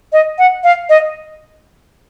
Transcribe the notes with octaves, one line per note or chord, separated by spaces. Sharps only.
D#5
F#5
F5
D#5